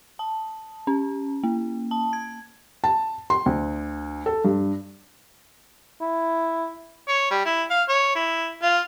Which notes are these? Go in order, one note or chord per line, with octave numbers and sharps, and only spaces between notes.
A5
C#4
A#3
A5
G#6
A5
C6
D2
A4
G2
E4
C#5
G3
E4
F5
C#5
E4
F4